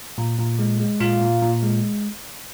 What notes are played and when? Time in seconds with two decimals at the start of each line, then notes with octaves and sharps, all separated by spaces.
0.18 A#2
0.38 A#2
0.59 G#3
0.80 G#3
1.00 A#2 F4 F5
1.21 A#2
1.42 A#2
1.63 G#3